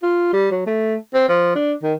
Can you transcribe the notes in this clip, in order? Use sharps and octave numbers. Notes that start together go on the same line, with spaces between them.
F4
G3
F#3
A3
C4
F3
D4
D#3